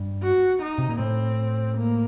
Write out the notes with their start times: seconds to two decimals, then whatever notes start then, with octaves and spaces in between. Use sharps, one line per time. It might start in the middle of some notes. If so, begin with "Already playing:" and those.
Already playing: G2
0.23 F#4
0.62 D#4
0.78 C3
0.89 A#2
0.99 A2 C4
1.77 A#3